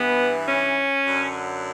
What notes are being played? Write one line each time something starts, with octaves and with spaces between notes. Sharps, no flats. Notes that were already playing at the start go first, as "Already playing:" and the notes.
Already playing: G2 E3 B3
C#4
F#2 D3